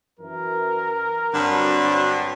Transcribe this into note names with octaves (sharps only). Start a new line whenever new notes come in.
F#2 E3 A#4
G2 D3 F#3 C4 C#5